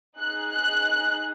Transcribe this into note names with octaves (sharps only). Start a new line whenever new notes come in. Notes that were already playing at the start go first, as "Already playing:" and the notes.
D#4 G#4 F#6
F#6